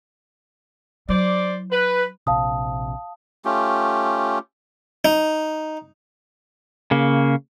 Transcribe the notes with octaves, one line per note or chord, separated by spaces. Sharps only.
F#3 E4 C5 D5
B4
A#1 C3 F5 A5 D#6
A3 C#4 F4 G4
D#4
C#3 A#3